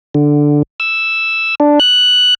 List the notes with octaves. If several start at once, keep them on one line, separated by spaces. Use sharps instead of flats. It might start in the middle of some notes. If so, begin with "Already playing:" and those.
D3
E6
D4
F#6